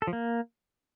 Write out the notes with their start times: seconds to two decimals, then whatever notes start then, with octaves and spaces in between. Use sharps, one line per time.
0.02 A4
0.07 F3
0.13 A#3